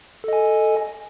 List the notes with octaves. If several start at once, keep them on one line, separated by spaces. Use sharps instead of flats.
A4 D#5 G#5